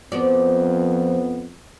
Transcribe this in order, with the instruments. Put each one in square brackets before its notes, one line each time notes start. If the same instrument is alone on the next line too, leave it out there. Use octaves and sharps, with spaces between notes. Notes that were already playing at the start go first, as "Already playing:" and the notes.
[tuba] F2 [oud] F3 F#4 D5 [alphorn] B3